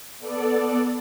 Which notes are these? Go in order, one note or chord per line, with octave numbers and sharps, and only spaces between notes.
B3 A4 D5